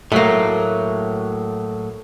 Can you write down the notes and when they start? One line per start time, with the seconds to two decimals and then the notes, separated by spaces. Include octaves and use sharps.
0.12 A2 F#3 A3 A#3